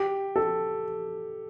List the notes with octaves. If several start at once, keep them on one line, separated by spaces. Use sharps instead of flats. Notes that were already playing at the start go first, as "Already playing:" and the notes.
Already playing: G4
A4